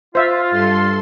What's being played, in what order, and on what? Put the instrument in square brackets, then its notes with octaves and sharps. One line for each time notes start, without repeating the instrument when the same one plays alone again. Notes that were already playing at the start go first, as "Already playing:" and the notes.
[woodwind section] F4 [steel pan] C5 E5 F5
[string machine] G2 A4 C6